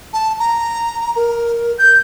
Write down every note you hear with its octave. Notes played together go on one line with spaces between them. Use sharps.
A5
A#5
A#4
G6